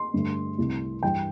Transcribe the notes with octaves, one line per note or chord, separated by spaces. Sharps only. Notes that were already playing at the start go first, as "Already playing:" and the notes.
Already playing: C6
G2 D3 A3
C2 C3 A3
G2 E3 G3 G5